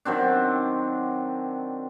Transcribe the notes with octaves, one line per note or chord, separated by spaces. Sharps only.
D#3 F#3 C4 D4